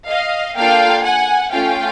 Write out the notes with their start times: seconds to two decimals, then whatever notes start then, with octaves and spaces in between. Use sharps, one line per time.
0.08 D#5 F5
0.56 A#3 D4 F4 A4 F5 G5
1.04 F#5 G#5
1.52 A3 C#4 F4 F5 G5